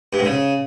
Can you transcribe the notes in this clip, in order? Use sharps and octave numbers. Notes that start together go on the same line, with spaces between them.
G2
G#2
C#3